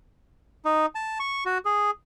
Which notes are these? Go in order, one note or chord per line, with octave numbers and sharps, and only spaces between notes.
D#4
A5
C#6
F#4
G#4